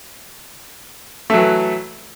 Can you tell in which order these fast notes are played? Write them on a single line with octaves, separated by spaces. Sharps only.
A3 F#3 E3